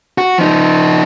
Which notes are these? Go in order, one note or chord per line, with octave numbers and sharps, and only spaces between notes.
F#4
F3 D#4